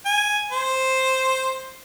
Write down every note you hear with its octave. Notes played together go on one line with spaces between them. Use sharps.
G#5
C5